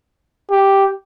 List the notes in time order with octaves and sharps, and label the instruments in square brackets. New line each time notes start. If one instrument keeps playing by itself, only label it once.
[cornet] G4